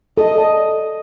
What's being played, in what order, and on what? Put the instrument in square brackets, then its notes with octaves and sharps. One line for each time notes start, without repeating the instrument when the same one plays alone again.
[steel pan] A4 [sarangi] D#5
[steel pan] D5 A5